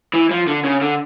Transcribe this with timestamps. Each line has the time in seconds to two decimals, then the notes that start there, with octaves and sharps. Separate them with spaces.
0.14 E3
0.31 F3
0.47 D3
0.64 C#3
0.82 D3